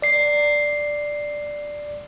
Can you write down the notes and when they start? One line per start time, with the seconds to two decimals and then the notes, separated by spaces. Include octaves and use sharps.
0.02 D5 C7